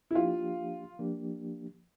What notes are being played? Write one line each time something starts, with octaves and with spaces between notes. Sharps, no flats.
E4
F3 A#3 D4 F4 G4
F3 A#3 D4 G4